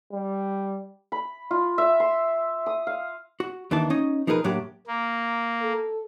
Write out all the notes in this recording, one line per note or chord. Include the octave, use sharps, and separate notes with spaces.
G3
B5
F4
E5
C6
D#6
F5
F#4
D#2 D#3 E3 D4 A5
C#4 D#4 D#5
F3 D#4 G#4 A#4 B4
A2 F#3 A#3 D4 G4
A#3
A4